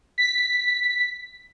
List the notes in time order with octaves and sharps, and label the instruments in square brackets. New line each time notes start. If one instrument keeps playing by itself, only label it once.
[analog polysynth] B6